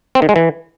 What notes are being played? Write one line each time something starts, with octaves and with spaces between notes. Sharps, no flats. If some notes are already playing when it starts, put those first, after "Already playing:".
C4
D#3
G#3
E3